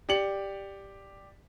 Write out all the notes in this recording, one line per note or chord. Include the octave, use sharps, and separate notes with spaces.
G4 D5 C#7 F#7